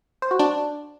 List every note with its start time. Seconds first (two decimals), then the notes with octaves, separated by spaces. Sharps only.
0.22 C5
0.31 F#4
0.39 D4